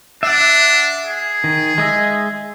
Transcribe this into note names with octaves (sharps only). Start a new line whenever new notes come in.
D4 E5 F#5
G#4
D#3
G#3 D#5 E5